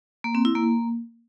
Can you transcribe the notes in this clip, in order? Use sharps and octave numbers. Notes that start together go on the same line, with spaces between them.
A#3
C4
E4
A#3